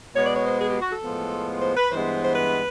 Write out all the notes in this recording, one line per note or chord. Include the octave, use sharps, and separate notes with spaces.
B2 G#3 B3 C#5
D5
C#5
C5
G#4
G4
F#4
A4
A2 F3 G#3 B3
C5
B4
G2 E3 G#3 B3 C5
C5
B4